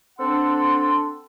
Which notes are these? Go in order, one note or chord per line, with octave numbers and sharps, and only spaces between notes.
C4 D4 A4 F#5 C6